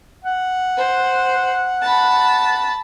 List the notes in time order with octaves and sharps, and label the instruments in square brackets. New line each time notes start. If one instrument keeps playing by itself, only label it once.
[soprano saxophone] F#5
[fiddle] C5
A5 B5